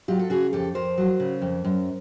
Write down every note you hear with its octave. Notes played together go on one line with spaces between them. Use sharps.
F#3 F4 G4
A4
C#3 F#4 G#4
F2 G4 A4
F2 A#4 C5
F#3
C#3
F2
F#2